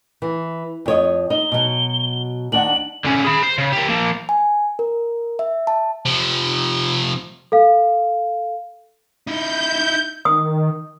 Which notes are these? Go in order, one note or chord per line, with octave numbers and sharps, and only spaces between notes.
E3
F2 C#5 D#5
D#4 G7
B2 F#3
D#2 D4 F#5 F#7
D3 C#4
G#4 B5
C5
C#3
G4 A#4
F3 A#3
G#5
A#4
E5
A5
C3 F3
A4 F5
D#4 E4 G6
D#3 D#6